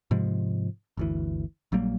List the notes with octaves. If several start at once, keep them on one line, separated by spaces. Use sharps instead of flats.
G#2 C3 F3 G#3
G1 D2 E3
A#1 F#3 G3 A#3